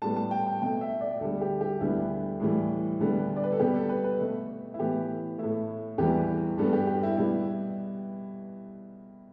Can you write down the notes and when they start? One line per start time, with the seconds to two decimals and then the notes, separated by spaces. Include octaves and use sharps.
0.02 A2 G3 B3 A5
0.16 A5
0.31 G5
0.47 G5
0.61 B2 A3 G5
0.81 E5
1.01 D5
1.21 D2 D3 G3 A4
1.41 G4
1.61 G4
1.81 D2 D3 G3 B3 E4
2.40 A2 E3 G3
3.00 D2 D3 G3 B3
3.36 D5
3.43 B4
3.52 A4
3.60 B2 G3 B3 G4
3.74 A4
3.89 B4
4.04 B4
4.19 B2 A3
4.74 E4
4.79 A2 E3 B3 G4
5.38 A2 A3 E4
5.98 E2 E3 G3 B3 G4
6.58 G2 G3 B3 A4
6.73 G4
6.87 G4
7.03 E4
7.17 B2 G3 B3 E4